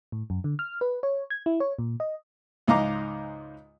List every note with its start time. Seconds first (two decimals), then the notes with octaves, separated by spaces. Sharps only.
0.12 A2
0.30 F#2
0.44 D3
0.59 F6
0.81 B4
1.03 C#5
1.30 G#6
1.46 E4
1.60 C#5
1.79 A#2
2.00 D#5
2.68 C#2 G#2 D#5 F5 A#5 D6